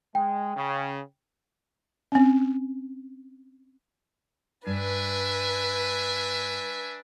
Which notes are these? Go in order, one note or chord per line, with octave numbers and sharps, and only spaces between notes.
G#3 G5
C#3
C4 C#4
G2 D4 B4 E5 G#5